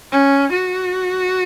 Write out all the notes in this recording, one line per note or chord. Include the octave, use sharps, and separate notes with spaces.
C#4
F#4